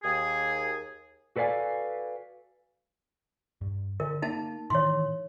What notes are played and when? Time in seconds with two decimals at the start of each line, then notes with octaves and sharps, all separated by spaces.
0.03 D#2 G#4
1.36 F#4 A4 B4 D5 F5 G#5
3.61 G2
4.00 D3 A#4
4.22 A#3 D#4 A5
4.70 A2 D#3 E3 C#5 C6